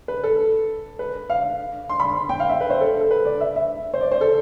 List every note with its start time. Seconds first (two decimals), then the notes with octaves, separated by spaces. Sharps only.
0.08 B4
0.24 A4
0.99 B4
1.29 F5
1.89 C6
2.00 B5
2.09 C6
2.29 G5
2.40 F5
2.49 E5
2.61 B4
2.70 C5
2.81 A4
3.01 A4
3.11 B4
3.25 D5
3.41 E5
3.56 E5
3.94 C5
4.01 D5
4.12 C5
4.21 A4